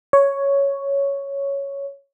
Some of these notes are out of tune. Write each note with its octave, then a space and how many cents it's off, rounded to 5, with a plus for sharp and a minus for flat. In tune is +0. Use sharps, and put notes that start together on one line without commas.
C#5 +5